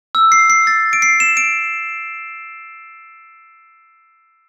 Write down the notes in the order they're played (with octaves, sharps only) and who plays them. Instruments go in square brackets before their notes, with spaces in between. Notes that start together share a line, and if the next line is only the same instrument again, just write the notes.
[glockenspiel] E6
C7
C7
A6
D7
C7
E7
D7